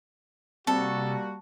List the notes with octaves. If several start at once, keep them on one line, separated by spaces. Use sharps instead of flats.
C3 G3 A#3 F#4 A4 C#6